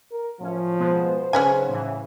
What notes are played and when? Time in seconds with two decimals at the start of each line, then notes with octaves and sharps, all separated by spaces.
0.11 A#4
0.40 A2 F3 C#4
0.79 B2 G#3 B3 C5
1.33 G#2 C#3 F#3 C#4 B4 G#5
1.69 A2 E3